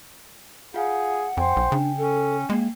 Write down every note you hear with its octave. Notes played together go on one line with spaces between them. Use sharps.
F4 G#4 F5 F#5
F2 C5 G5 G#5
B1
C#3 D4
C#4 A4
G#3 A#3